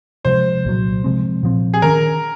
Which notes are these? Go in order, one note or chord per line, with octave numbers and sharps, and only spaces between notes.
C3 F3 G#3 C5
C2 A#2 F#3
C3 F3 G#3 C4
A#2 F3 C4
G#4
D#3 A#3 C#4 A#4